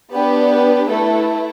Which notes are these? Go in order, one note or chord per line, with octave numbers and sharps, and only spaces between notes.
B3 D4 G4 B4
B4
A3 E4 A4 B4